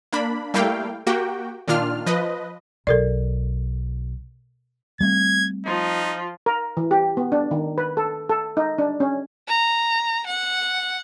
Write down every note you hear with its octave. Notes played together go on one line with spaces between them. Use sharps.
A#3 D4 B5
G3 A3 A#3 E4 F5 G5
A#3 F#4 G4 G5
A#2 D#3 D4 F4 F6
F3 B4 D#5
B1 A4 A#4 D5
G3 A3 C4 G#6
F3 D#4 F4
A#4
E3
G4
B3
D4
D#3
B4
A4
A4
D#4
D4
C#4
A#5
F#5